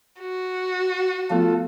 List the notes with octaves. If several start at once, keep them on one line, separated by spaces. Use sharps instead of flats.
F#4
F3 A3 B3 F4 A4